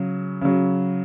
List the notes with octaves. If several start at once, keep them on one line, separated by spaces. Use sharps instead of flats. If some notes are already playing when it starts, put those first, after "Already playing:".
Already playing: C#3 F#3
C#3 F#3